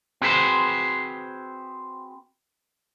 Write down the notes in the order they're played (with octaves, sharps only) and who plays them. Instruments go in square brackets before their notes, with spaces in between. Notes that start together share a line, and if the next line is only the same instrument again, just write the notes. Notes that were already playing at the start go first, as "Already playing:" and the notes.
[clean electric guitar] C4 F#4 G#4 B4 C5